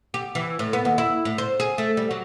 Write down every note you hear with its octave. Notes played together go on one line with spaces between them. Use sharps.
G4
E3
A2
B3
D#2
E4
A2
C5
G#4
A3
G3
F#3